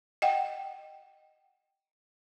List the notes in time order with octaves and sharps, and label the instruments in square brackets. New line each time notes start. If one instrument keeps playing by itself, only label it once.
[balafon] D#5 F#5 G5